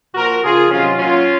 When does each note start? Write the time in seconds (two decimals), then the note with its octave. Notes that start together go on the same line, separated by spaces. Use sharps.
0.15 A#2 F3 F#4 A#4
0.43 C#3 F3 F4 G#4
0.71 C3 D#3 F#3 C#4 F4
0.99 A#2 F#3 C#4 F4